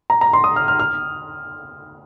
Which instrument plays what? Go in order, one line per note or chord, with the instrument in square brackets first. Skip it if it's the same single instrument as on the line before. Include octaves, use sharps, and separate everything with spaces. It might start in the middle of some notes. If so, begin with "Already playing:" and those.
[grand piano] A#5
A#5
C6
D#6
F6
F6
F6